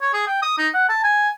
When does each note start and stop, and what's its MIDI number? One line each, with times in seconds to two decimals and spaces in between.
0.01 0.09 73
0.13 0.25 68
0.27 0.42 79
0.42 0.53 87
0.58 0.68 63
0.74 0.89 78
0.89 0.99 81
1.03 1.29 80